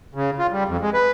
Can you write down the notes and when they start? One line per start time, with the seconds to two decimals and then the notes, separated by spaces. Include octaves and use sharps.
0.15 C#3
0.39 F4
0.52 G3
0.68 F2
0.81 G#3
0.94 B4